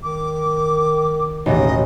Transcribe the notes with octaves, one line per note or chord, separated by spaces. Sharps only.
D#3 D6
A1 D#2 B2 D#5